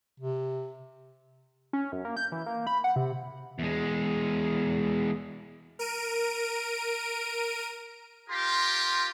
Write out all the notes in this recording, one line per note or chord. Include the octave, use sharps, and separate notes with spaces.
C3
C#4
F#2
A#3
G6
E3
A#3
B5
F#5
C3
E2 G#3
A#4 D7 D#7
F4 G4 A#4 C6